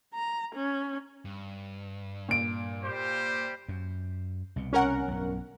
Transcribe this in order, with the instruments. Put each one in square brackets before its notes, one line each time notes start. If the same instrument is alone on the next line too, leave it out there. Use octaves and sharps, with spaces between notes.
[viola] A#5
C#4
[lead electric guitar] G2
[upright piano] A#2 D7
[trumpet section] G3 G4 C5
[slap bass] F#2
C2 B2
[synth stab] C#4 A#4 F#5
[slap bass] B1 G2